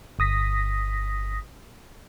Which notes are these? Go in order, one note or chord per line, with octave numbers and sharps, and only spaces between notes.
G1 D#6 A#6 B6